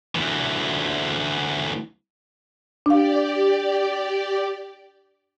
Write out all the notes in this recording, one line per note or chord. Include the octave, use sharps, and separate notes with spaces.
D2 E3
D4 G4 D5 F5